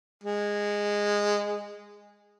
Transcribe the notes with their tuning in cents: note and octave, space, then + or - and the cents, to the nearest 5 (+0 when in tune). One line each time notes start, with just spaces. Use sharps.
G#3 -15